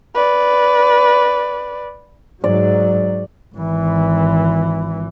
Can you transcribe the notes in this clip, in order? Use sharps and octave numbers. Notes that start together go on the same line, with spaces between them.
B4 D5
G#2 F#3 D5
G#1 E3